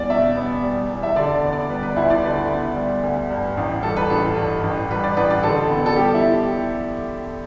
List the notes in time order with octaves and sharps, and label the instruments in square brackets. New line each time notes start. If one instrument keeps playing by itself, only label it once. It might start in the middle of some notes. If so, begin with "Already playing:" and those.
Already playing: [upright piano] E2 G3 B3 D5
B2 E5
B3
G3
E2
E5
D3 D5
D5
B3
D5
G3 B4
B4
D2 E4
D5
D3 B4
B3
G3
D2
G2
A1
G3 A4
B4
A1 A4
G2
A1
G3 B4
D5
A1 B4
D5
D3 A4
B3
A4
G3 G4
E4